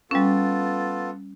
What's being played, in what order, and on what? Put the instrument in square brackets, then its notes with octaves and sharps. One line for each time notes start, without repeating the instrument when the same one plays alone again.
[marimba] G3 C#4 [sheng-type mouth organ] B3 F4 A4